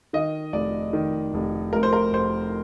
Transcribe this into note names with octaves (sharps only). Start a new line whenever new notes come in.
D#3 D#5
F1 D5
D#3
F1
F1 A#4
C5
A#4
F1 C5